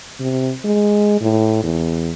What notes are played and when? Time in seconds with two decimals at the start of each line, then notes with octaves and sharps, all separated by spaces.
0.20 C3
0.65 G#3
1.21 A2
1.63 E2